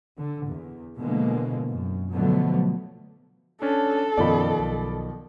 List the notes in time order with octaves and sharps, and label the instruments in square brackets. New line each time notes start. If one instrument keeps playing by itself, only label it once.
[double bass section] D3
E2
B2 D3 E3 F3 G#3 A#3
F#2
B2 D3 F3 F#3 A3 B3
[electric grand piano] C#4 D4 [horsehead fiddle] A4
[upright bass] F#2 A#3 [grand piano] B2 D#3 F3 [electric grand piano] D5 B5
[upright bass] B1